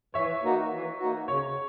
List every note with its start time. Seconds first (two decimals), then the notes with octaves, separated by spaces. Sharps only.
0.14 E3 C#5 E5
0.43 A#3 D#4 F#4
0.72 E3
0.99 A#3 D#4 F#4
1.28 C#3 C#5